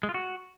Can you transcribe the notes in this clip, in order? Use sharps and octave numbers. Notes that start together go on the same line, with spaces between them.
G#3
F4
F#4